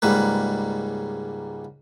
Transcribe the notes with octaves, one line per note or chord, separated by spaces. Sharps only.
C#2 G#2 G3 A#3 B4